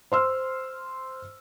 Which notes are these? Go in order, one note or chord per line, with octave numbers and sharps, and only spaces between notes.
C5 C6 E6 F6